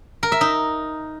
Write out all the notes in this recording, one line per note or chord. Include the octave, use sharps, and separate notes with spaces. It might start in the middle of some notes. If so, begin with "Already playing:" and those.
A#4
E5
D#4